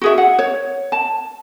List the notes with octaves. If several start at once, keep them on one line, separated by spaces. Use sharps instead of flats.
F#4 G#4 E5
F#5
C#5
A5